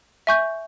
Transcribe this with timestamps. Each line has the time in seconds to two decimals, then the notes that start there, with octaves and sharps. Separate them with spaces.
0.27 E5 G#5 C#6 G6